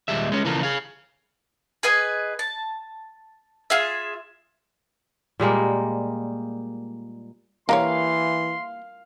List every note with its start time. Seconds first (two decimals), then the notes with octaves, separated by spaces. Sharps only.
0.08 D#2 A#2 G3 G#3 E5
0.32 G#3 C#4
0.45 C#3 E3 F3 A#3 A4 A#4
0.63 G#4 F5
1.83 G#4 B4 D#5 G#5
2.39 A5
3.70 F4 G#4 E5
5.40 A#2 G3 G#3 A#3
7.69 E3 A#3 G4 C#5 F5 C6